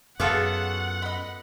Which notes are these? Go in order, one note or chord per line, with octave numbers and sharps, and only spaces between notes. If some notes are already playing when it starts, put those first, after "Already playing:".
F#2 B3 F4 F#4 G#4 A4 F#5 D6
D#5 B5